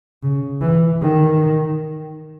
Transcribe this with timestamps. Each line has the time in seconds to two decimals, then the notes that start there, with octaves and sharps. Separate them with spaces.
0.23 C#3
0.61 E3
1.01 D#3